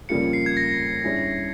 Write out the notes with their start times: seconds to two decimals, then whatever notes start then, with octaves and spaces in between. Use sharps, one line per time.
0.09 F2 C#3 G3 A#3 F4 C#7
0.33 C7
0.46 G#6
0.57 A#6
1.04 G2 G3 C#4 E4 G#4